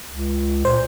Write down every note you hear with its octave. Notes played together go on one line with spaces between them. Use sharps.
C#2
A#2 C5